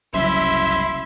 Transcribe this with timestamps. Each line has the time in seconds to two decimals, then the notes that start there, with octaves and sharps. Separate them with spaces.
0.14 F#1 C2 F#2 E4 E5 C6